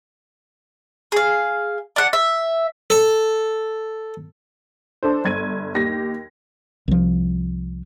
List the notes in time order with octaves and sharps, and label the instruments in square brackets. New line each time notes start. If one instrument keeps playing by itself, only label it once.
[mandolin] G#4 F5
D4 F#5
E5
[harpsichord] A4
[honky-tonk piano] D4 A4 C5
G1 G#6 D#7
D#2 G4 A#6
[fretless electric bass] C2 F3